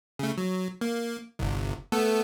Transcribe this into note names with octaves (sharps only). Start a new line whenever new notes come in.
C#3 A3
F#3
A#3
G1 C2
A3 B3 A4